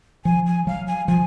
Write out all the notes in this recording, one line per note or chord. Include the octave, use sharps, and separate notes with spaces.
F3 G#5
G#5
F#3 F5
G#5
F3 G#5